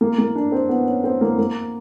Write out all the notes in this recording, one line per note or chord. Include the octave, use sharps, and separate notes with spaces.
A#3
A#3
D4
C4
B3
C#4
C4
A#3
A#3